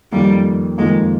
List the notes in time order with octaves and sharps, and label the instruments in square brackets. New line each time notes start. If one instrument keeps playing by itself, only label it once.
[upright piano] F2 D#3 A#3 F4 [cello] G3
[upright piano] F2 D#3 A#3 F4 [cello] G#3